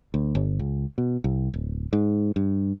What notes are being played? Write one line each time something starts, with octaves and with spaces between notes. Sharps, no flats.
D2
G1
C#2
B2
C2
D1
G#2
G2